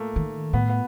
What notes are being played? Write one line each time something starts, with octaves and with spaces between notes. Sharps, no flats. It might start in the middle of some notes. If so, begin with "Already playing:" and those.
Already playing: A3 A#3
D#3
A2 B3
B3